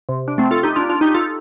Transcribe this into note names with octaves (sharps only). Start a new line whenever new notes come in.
C3
D4
A3 C4
F4 A4
D#4 G4
D4 F4
D4 F4
D#4 G4
F4 A4